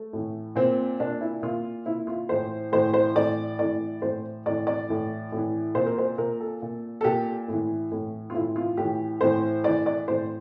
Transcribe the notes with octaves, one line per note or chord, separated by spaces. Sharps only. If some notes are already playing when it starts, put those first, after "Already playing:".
Already playing: A3
A2 E3
A#2 C4
A#2 D4
E4
A#2 F4
A#2 E4
F4
A2 E3 C5
A2 E3 C5
C5
A2 E3 D5
A2 E3 D5
A2 E3 C5
A2 E3 D5
D5
A2 E3
A2 E3
A#2 C5
A#4
C5
A#2 A#4
A4
A#2
A4
A#2 G4
A2 E3
A2 E3
F4
A2 E3 E4
F4
A2 E3 G4
A2 E3 C5
A2 E3 D5
D5
A2 E3 C5